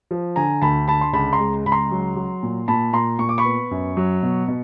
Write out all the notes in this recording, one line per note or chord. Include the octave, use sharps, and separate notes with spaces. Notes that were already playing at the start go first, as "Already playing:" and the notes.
F3
D3 G#5 A#5
D2 A5 B5
D3 A5 B5
C6
C#2 A5 B5
A#5 C6
G#3
C#2 B5
A#5 C6
F#3
F#3
A#2
A#2 A5 B5
A#2 A#5 C6
A#2 C#6
D6
B5 C#6
B3
F#2
F#3
B2
B2